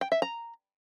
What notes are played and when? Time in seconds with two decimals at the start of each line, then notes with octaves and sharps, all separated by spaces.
0.01 G5
0.12 E5
0.22 A#5